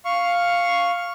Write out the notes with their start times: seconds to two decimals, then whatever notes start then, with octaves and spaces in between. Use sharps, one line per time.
0.05 F5 C#6